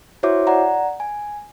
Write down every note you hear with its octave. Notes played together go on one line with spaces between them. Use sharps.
E4 F#4 C5 C#5 E5 D6
D5 F#5 A#5
G#5